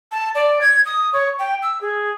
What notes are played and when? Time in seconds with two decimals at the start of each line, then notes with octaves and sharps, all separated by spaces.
0.12 A5
0.35 D5
0.61 G#6
0.86 D#6
1.13 C#5
1.39 G5
1.62 E6
1.81 G#4